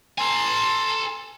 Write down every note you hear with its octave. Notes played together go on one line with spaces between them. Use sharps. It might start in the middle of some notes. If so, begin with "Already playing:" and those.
A4 G#5 A#5 C6